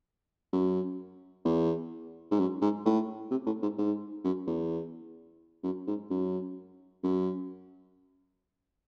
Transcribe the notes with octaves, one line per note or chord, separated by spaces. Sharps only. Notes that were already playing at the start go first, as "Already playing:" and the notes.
F#2
E2
G#2
F#2
G#2
A2
C3
A2
G#2
G#2
F#2
E2
F#2
G#2
F#2
F#2